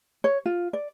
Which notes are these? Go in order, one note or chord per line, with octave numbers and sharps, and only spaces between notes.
C#5
F4
D5